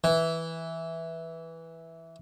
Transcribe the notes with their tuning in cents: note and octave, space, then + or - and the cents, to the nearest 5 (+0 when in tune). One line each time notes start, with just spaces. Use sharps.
E3 -5